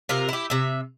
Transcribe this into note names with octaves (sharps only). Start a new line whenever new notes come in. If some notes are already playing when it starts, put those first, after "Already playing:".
C3 F4 A#4
E4 G4
C3 E5